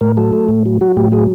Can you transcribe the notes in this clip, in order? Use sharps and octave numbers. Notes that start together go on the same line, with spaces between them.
A2 A#4
F#3 A4
A3
A2
F#3
F#3 F#4
A2 G4
F#3 G#4